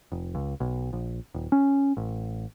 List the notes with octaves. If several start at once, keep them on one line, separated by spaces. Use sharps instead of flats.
F1
C#2
B1
A#1
D#1
C#4
A1